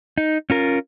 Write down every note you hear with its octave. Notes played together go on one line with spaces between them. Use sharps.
D#4
C#4 F4 A#4